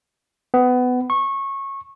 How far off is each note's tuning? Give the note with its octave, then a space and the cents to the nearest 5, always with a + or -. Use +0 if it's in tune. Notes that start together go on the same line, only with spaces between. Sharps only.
B3 +20
C#6 -20